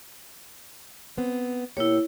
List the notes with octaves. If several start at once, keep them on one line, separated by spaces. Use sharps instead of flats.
B3 C4
B2 A#3 E4 G4 C#5